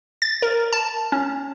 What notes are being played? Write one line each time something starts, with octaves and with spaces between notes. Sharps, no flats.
A6
A#4
A5
C#4